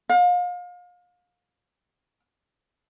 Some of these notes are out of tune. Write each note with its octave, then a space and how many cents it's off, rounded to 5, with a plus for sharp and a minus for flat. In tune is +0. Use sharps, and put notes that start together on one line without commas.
F5 +35